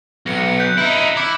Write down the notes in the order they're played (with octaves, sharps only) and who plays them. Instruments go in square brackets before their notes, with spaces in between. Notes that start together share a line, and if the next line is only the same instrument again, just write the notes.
[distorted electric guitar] B1 [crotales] A#6 C#7
[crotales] F#6 G6 B6
[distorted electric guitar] D#4 E4
[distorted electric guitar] E4 [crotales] D6 C#7